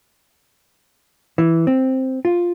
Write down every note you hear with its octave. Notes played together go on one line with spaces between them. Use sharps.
E3
C4
F4